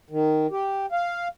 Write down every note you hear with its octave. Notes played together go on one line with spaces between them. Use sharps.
D#3
G4
F5